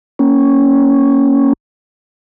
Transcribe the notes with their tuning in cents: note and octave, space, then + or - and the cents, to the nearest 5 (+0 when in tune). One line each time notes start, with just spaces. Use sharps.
A#3 -5 C#4 +0